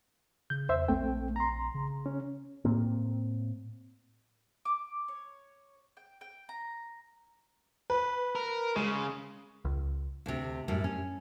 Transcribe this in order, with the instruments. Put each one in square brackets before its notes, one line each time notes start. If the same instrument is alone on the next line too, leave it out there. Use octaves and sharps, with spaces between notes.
[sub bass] C#3 [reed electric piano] G6
[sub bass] E2 [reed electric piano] C5 E5
[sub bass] A#1 [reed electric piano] A3 C4 G5
[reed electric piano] A#5 C6
[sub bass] C#3
[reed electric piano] C#4
[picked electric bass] A2 A#3 C4
[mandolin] D6
C#5
G5
G5
A#5
[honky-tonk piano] B4
[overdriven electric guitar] A#4
[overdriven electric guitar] C#3 [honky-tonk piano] G#3
[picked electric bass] C#2
[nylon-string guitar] D2 C3
F#2 A2 G3
C#4